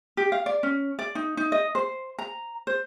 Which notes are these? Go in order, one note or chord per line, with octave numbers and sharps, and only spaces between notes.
G4
F5
D5
C#4
D5
D#4
D#4
D#5
C5
A#5
C5